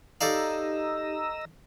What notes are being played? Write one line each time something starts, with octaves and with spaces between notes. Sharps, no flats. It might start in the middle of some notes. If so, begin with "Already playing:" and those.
D#4 G4 A4 D5 D#5 F5 A#5 E6